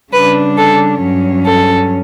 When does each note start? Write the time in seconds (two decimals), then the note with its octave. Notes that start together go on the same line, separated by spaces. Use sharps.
0.12 C#3 G3 D4 B4
0.57 A4
1.01 G2 F#3 C#4
1.45 A4